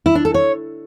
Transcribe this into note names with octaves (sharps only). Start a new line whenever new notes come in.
E4
D4
A4
C#5